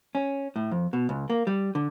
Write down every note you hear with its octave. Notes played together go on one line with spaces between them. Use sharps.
C#4
A2
F2
B2
C#2
A#3
G3
D3